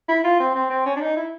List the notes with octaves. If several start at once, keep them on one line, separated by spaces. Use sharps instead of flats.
E4
F4
C4
C4
C4
C#4
D4
D#4
E4